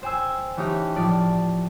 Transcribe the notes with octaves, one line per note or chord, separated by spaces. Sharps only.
C5 G5 G#5 E6
E3 A3 C#4 D#4 G4
A2 F3 A4 D5